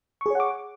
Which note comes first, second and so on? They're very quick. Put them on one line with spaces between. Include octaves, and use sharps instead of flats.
C#6 G#4 C#5 F#5 D6